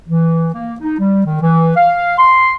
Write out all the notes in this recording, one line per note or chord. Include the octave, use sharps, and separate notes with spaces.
E3
A#3
D#4
G3
D#3
E3
F5
C6